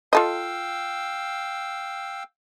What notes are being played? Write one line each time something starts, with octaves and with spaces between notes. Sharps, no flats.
F4 A4 D#5 F5 G5 E6